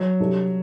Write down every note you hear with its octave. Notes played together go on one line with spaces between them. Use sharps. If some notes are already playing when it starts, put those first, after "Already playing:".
Already playing: F#3
C2 C3 G3 D4 A4